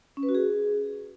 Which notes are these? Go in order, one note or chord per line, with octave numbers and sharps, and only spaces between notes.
C#4
B4
F#4
G#4